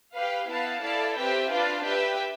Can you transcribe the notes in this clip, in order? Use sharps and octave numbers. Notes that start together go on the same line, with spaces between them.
G4 B4 F5
B3 E4 B4 F5 A5
E4 A4 D5 F5 A5
C4 G4 B4 E5 G5
D4 F4 B4 D5 F5
G4 B4 E5 G5